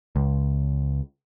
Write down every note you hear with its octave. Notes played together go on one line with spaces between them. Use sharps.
C#2